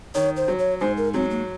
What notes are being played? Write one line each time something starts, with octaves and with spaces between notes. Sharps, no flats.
D#3 C#5
C5
F#3
C#5
G#2 C5
A#4
F#3 C4
A#3